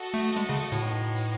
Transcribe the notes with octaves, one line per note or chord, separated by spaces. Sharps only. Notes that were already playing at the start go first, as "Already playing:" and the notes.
Already playing: F#4 A4 D#5
A3
G#3
C#3
A2
B3 D#4 F#4